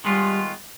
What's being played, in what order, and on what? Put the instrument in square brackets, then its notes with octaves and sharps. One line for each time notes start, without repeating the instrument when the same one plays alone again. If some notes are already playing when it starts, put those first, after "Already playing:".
[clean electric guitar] D#3 G#3 B3 F4 [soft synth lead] G3